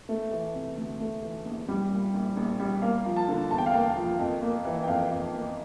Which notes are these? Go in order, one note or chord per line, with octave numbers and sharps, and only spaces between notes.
A3
E3
C3
D2
A3
E3
A#1
G3
A#2
A#1
A#1
G3
A#3 F5
F3
A5
D3
E2 A5
G5
F5
A#3 G5
F3
F2
A#3
E3
G5
F2 F5
F2
A#3